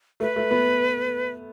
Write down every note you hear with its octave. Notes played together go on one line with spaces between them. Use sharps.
A3 B4
A3
B3